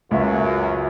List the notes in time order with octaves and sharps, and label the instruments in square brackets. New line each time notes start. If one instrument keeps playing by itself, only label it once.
[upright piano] C#2 E5 [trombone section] F#2 F#4